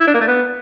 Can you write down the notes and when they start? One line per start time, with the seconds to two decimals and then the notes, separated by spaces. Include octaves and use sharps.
0.01 E4
0.07 D4
0.14 A#3
0.21 A3
0.28 B3